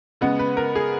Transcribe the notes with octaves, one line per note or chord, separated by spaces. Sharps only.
C#3 G#3 B3 F#5
B4
A#4
G#4